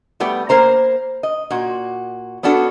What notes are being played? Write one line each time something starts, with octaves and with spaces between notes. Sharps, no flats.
G3 A3 B3 G4
A#3 A#4 C5 A#5
D#5
A#2 F#4
B3 C#4 D4 F#4 A4